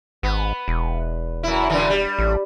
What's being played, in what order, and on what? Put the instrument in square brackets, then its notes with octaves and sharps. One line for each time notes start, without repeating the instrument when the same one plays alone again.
[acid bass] G#1 [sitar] B3
[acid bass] E1
[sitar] F#2 E4
F#2 D3 E3
G3
[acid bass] A1